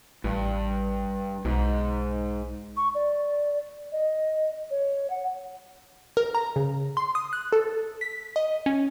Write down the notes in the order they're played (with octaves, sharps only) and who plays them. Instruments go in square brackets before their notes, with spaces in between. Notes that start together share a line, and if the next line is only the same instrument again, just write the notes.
[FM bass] A1 [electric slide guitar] G2
[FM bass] B1 [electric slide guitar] G#2
[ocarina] C#6
D5
D#5
C#5
F#5
[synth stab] A#4
A#5
C#3
C6
D#6
F#6
A4
B6
D#5
C#4